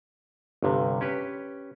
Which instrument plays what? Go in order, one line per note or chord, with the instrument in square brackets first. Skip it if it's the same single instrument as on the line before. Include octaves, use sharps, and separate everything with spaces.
[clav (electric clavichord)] G1 G2 C3
C#4 G4 B4